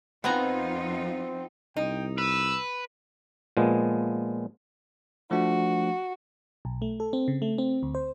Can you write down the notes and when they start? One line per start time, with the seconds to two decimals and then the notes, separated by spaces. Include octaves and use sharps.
0.24 F2 B3 C4 D#4 F4 G#5 A#5
1.76 C2 D#4 G5
2.18 B4 E6
3.57 A#2 F3 G#3 B3
5.31 F3 A3 D4 F#4
6.65 B1
6.82 A3
7.00 A4
7.13 C4
7.28 C#3
7.42 A3
7.58 C4
7.83 D2
7.95 C5